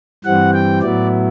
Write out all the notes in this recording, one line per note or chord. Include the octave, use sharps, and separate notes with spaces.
G2 E3 G3 C4 F#5
G5
A2 F#3 B3 E4 D5